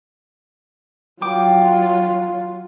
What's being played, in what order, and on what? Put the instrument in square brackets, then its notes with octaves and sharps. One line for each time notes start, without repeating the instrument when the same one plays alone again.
[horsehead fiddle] F#3 F4 [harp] G5 D6